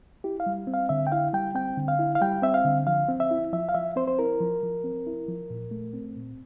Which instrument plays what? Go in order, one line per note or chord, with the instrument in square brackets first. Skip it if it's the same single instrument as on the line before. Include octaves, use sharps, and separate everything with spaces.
[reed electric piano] E4 G4
F5
G3
C4
F5
D3 E5
G5
E4 F5
G3 G5
C4 G5
D3
F5
E4
F5
G3 G5
C4 E5
F5
D3
F3 F5
C4
E5
E4
F3 E5
F5
F3 E5
C4 C5
C5
E4 A#4
F3
F3
C4
E4
F3
A#2
A3
C4
A#2